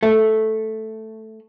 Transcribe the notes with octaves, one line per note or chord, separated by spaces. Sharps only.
A3